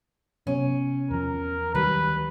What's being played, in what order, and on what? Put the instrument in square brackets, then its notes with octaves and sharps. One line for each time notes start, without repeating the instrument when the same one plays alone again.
[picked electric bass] C3 B3 [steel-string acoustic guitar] C#4
[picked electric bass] E2 F3 [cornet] A#4
[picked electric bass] D2 D#3 F#3 [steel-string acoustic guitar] G3 [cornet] B4